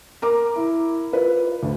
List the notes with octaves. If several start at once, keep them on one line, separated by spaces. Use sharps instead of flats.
A#4 A#5 D6
E4
F4 B4
D2